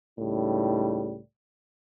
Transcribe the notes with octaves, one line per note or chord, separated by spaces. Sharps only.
C#2 A2 G3 D#4